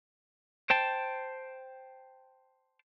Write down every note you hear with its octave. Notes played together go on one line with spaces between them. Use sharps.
C5 G5 A5